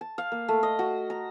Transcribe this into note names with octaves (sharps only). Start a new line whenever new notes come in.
A5
F5
A#3
A3
D#5
F#4
A#5